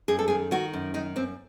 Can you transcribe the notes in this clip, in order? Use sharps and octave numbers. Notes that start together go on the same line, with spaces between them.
F#2 G#4
A4
D#3 G#4
D#3 F#4
F#2
D#3 D#4
F#2 C4